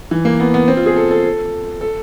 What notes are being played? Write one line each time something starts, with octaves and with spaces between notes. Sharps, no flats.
E3
A#3
B3
B3
C4
F4
G#4
A4
A4
A4